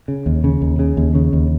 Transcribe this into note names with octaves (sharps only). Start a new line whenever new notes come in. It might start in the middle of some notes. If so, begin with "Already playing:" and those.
C#3
D#2
C#3
D#2
C#3
D#2
C#3
D#2